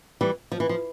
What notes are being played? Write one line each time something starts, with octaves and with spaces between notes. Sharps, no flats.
E3 G3
F3
E3
F3